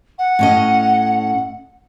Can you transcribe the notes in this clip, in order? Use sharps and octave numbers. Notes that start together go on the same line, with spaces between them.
F#5
A2 C#4 D#5